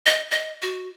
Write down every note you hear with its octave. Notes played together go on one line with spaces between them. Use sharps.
D#5
D#5
F#4